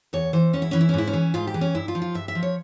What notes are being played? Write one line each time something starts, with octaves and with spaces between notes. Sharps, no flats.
E2 C#5
E3 C5
E2 C#4
E4
E3 C#4
E4
C#4
G#2 E4
C#4
E3
G#2 F4
G4
E3
C#4
G2 E4
F4
F3
F4
G2 E5
E5
F3
C#5